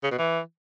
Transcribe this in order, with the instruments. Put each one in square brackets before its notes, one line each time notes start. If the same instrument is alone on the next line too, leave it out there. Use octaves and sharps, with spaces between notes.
[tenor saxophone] C#3
B2
E3